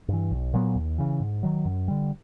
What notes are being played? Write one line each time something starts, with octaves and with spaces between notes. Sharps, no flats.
G2 E3
B1
A#2 F#3 B3
D#2
C#3 E3
G#2
D#3 F#3
F#2
D3 G3